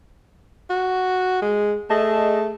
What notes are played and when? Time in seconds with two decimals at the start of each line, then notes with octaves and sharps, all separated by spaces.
0.70 F#4
1.42 G#3
1.90 A3 G#4 D#5 A5